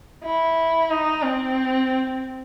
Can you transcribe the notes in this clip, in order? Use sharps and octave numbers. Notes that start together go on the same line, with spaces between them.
E4
D#4
C4